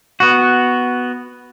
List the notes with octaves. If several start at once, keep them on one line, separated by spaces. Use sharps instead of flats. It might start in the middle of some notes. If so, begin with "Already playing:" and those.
B3 F#4